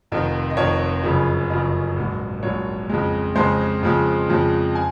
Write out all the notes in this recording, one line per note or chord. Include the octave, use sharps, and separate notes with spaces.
F1 F2 D#3
D#5
F1 F2 D#3 C#5
F#1 F#2 C#3 F3
F#1 F#2 C#3 F3 D#5
A#1 G#2 F#3
A#1 G#2 F#3 C#5
F2 C#3 G#3
F2 C#3 G#3 C5
F2 C#3 F3 G#3
F2 C#3 F3 G#3
G#5